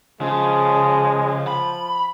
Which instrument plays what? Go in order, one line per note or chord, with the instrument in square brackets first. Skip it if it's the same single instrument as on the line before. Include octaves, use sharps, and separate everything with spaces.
[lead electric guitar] C#3 [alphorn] F3 [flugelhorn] G#3
[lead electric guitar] B5